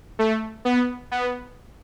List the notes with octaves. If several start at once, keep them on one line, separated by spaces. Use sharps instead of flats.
A3
B3
B3